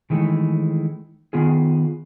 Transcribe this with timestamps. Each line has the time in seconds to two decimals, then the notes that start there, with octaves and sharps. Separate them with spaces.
0.10 D#3 E3 G#3 A3
1.33 D#3 B3 F4 G#4